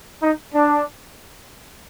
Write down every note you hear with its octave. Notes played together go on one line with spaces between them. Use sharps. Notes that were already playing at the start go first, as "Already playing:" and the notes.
D#4
D4